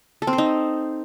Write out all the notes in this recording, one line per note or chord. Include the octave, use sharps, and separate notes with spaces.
A4
C4
C5
D#4